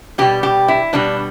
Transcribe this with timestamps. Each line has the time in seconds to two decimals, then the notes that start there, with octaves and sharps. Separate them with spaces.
0.18 B2 G3 G4
0.43 G4
0.68 E4
0.93 B2 G3 D4